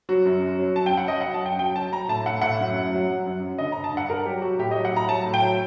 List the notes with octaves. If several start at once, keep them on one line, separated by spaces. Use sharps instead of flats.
F#3 F#4
F#2
F#2
F#3
F#2 A5
G5
F#3
F#5
F#3 D#5
F#5
F#3
A5
F#2 G5
F#3 G5
F#3 A5
F#3 A#5
A2 A5
A2 F#5
A2 F#5
F#2
F#2
F#3
F#3
F#2
F#3
D3 D#5
A#5
G2
A5
G2 F#5
G2 A#4
F#3 G4
F#3 F#4
A2 G4
D#5
F#3
F#5
A2 A#5
F#3 A5
A2
G5
F#3